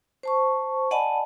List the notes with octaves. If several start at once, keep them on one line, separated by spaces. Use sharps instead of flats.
C5 A5 C#6
D5 D#5 F#5 G#5 A5 B5